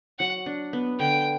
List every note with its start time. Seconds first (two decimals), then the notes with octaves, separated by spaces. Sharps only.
0.19 F#3 F#5
0.46 D4
0.73 B3
0.99 D3 G5